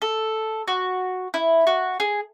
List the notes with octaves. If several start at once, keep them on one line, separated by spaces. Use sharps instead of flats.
A4
F#4
E4
F#4
G#4